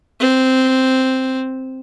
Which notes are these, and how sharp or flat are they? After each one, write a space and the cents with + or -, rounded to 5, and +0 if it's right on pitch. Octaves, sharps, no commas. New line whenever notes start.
C4 -5